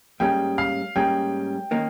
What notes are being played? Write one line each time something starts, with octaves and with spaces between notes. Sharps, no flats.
G#2 G3 A#3 C#4 G#4 G5
F5
G#2 G3 A#3 C#4 G#4 G5
D#3 A#3 C#4